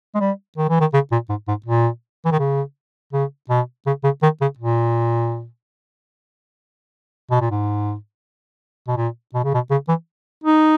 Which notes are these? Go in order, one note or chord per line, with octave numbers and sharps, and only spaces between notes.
G#3
G3
D#3
E3
D#3
C#3
A#2
G#2
G#2
A#2
E3
D#3
C#3
C#3
B2
C#3
C#3
D#3
C#3
A#2
B2
A#2
G#2
B2
A#2
B2
C#3
B2
C#3
E3
D#4